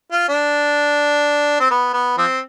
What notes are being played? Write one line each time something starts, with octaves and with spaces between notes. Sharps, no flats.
F4
D4
C4
B3
B3
F3 C4